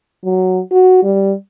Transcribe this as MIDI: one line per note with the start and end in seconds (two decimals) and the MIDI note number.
0.25 0.60 54
0.72 0.98 66
1.03 1.33 55